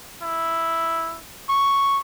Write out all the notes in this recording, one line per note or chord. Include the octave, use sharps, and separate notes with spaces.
E4
C#6